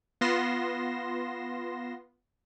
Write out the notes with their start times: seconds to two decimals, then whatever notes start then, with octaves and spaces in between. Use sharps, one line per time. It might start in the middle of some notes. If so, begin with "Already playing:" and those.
0.21 B3 F4 C6 A#6 E7